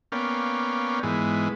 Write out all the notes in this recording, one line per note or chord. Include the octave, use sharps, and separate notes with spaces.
A#3 B3 C#4 D5 F5 G5
G#2 E3 G#3 B3